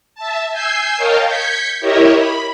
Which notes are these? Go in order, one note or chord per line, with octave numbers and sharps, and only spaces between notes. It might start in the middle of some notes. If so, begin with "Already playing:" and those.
E5 A5
G#5 E6 G6 C7
A#4 C#5 D#5 F5 G5 A5
G6 G#6 B6 C#7
E4 G4 A#4 C#5 D#5 E5
B5